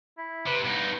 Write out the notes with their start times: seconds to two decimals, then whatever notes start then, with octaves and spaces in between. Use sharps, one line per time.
0.18 E4
0.47 C3 B4
0.65 G2 B3 D#4